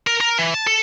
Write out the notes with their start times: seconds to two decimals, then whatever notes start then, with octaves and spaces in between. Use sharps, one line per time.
0.07 A#4
0.21 A#4
0.38 E3
0.54 A5
0.67 A4